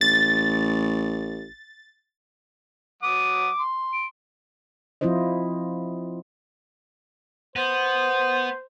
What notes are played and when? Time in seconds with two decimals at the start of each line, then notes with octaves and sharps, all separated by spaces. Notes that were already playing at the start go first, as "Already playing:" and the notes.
0.01 A1 A6
3.03 F#3 F#5 D6 D#6
3.59 C6
3.93 D7
5.01 F3 C4 E4 F4 C5 D#5
7.56 B3 C5